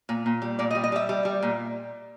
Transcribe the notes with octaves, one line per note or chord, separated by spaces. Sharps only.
A#2
A#2
G3
A#2 D5
D#5
G3
D#5
G3 E5
G3
G3
A#2